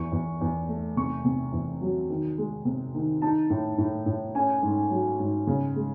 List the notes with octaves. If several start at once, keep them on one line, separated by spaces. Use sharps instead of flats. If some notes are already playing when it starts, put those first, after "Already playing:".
Already playing: E2 C#6
E2
E2
A3
C3 C#6
C3
E2
F#3
D#3
G#3
C3
D#3
D#4 A5
A2
A2
A2
C#4 G#5
G#2
F#3
G#2
C#3
G#3